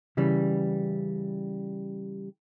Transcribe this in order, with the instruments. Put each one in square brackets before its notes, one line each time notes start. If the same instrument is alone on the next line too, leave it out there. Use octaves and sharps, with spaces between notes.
[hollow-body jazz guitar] C#3 E3 G3